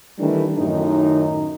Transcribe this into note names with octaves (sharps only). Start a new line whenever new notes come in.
D#3 E3 G3 A3 D4
F#2 A2 D#3 D#4